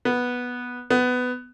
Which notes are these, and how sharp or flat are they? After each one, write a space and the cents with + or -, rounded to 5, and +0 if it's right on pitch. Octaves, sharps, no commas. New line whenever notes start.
B3 -5
B3 +15